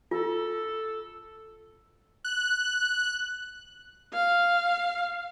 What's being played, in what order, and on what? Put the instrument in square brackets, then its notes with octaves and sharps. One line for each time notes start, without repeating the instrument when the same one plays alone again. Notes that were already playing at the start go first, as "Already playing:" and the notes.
[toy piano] F4 [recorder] A4
[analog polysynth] F#6
[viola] F5